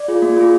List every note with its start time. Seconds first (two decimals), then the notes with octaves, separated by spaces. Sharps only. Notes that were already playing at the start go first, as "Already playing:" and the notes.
Already playing: D5
0.08 F4 G#4
0.22 A#3
0.37 F4 G#4